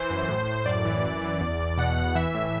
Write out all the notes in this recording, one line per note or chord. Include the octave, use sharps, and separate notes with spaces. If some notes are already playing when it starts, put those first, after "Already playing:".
Already playing: E3 C5
F#2
A2
A2
F#2 D5
E3
F#2
E3
E2
E2
B2 F#5
E2 F#5
E3 E5
A2